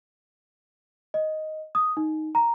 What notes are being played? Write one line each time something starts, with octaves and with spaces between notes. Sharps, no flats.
D#5
D#6
D#4
A#5